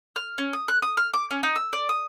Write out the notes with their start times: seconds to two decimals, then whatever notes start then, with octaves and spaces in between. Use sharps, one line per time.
0.16 F6
0.38 C#4
0.53 D#6
0.68 F#6
0.82 D#6
0.97 F6
1.14 D6
1.31 C#4
1.43 D#4
1.56 E6
1.73 D5
1.89 D#6